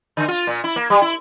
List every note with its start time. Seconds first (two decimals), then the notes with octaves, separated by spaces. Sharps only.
0.17 D3
0.28 F4
0.47 A#2
0.64 E4
0.76 A#3
0.90 G3
1.02 E4